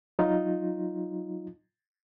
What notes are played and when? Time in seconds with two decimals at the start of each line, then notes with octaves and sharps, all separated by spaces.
0.19 F#3 D#4 F4